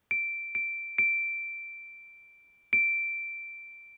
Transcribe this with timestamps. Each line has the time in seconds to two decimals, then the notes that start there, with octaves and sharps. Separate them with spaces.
0.11 D7
0.55 D7
0.98 D7
2.73 D7